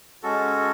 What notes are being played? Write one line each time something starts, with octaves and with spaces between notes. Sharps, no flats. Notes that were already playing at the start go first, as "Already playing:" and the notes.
G#3 C#4 F#4 A4